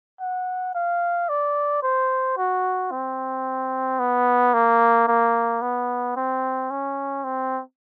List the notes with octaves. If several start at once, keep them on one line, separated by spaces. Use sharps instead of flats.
F#5
F5
D5
C5
F#4
C4
B3
A#3
A#3
B3
C4
C#4
C4